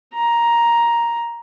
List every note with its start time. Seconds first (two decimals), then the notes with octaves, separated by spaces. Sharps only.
0.14 A#5